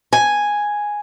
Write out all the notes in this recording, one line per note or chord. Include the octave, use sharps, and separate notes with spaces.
G#5